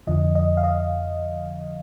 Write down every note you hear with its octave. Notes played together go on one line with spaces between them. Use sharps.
F2 D3 F3 D#5
D#5
F5
D#5